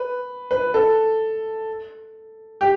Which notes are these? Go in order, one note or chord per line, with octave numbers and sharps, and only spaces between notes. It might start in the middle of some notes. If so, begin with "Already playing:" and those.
Already playing: B4
B4
A4
G4